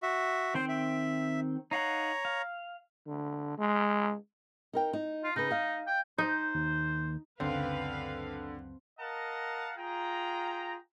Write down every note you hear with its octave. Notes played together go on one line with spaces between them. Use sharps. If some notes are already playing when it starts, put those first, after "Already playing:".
F#4 E5
D#3 C4 C5 G5
E5
D#4 C#5 F5 F#5 A#5
F5
D3
G#3
D#4 A#4 G5
D#4
F4
C#3 D#4 B4
D#5 F5
G5
D#4 C5
D#2
C#2 F#2 D3 C4 B4 F5
A#4 D#5 F5 F#5 A5 A#5
F4 G#4 G5 A#5